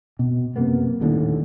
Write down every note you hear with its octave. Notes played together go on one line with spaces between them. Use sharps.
B2
F#2 C3 A#3 B3
D#1 D#2 A2 D3